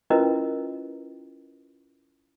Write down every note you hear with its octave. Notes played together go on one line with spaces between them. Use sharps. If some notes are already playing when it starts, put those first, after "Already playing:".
C#4 E4 F4 A#4 B4 D#5